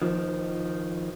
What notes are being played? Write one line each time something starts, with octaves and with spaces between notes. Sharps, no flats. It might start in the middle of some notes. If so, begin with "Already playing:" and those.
D#3 F3